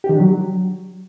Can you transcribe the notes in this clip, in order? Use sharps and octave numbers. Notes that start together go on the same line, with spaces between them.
G4
D#3
D4
F#3